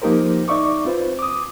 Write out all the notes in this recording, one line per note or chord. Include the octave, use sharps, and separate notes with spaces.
F3 A#3 D#4 G4 A#4 C5
D#4 D5 E5 C#6 D6
C4 F4 B4 C5
D6 D#6